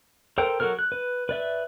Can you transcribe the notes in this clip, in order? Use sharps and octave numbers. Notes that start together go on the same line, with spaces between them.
A4 A#4 C5 G5
F#3 F#4 A4 A#4 F6
F#6
B4
B4 D5 E5